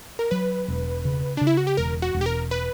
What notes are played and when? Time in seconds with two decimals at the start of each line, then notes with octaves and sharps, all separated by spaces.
0.19 A#4
0.31 F#3 B4
0.68 E1
1.05 C#3
1.37 C#3 D4
1.47 E4
1.57 F#4
1.67 G4
1.77 E1 A#4
2.02 F#4
2.14 E1
2.21 G4
2.26 A#4
2.51 B4